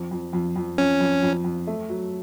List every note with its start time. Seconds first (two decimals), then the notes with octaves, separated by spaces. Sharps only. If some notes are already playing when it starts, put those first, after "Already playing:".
Already playing: F2
0.11 F2
0.33 F2
0.56 F2
0.78 F2 C#4
1.00 F2
1.23 F2
1.44 F2
1.67 A3
1.89 F#3